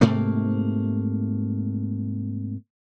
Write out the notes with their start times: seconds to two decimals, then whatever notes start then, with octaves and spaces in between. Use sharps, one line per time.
0.01 G#2 C3 A3 A#3